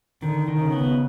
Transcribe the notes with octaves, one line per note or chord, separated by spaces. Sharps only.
D3 D#3
D#3
C#3
B3